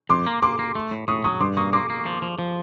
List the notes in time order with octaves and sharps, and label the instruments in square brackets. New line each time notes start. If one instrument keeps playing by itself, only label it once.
[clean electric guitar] F2 [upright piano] C6 D6
[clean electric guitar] A#3
[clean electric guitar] A#3 [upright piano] C6 D6
[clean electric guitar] A#3
A3
A2
[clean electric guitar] A2 [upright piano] C#6 D#6
[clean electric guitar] F#3 [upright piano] C#6 D#6
[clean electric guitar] G2 [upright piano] C6 D6
[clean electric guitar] A#3 [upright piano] C#6 D#6
[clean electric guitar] A#3 [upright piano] C6 D6
[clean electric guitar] A#3
F3
F3
F3